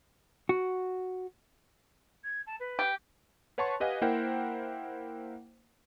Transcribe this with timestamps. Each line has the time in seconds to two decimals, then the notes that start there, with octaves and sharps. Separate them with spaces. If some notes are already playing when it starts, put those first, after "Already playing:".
0.49 F#4
2.24 G#6
2.47 A5
2.60 B4
2.79 G4
3.58 B4 C#5 F#5 A5 C6 C#6
3.80 G4 B4 D#5 F5 F#5 G#5
4.01 A#3 E4 A#4 C5 F#5 G5